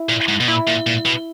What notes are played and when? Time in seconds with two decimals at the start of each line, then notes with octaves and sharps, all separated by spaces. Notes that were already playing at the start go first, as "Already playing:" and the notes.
Already playing: E4
0.09 A#2
0.28 G#2
0.40 B2
0.48 A#2 E4
0.67 A#2
0.87 A#2
1.06 B2